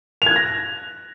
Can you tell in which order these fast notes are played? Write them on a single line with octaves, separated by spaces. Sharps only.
F7 G#6 F#6 A#6